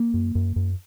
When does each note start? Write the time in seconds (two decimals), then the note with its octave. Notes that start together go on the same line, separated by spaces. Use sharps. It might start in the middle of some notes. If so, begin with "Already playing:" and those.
Already playing: A#3
0.14 F#2
0.35 F#2
0.56 F#2